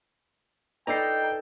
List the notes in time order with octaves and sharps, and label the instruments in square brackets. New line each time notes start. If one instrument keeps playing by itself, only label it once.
[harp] D#4 A4 [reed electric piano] B4 D5 D#5 [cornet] G5 [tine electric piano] A#5 C7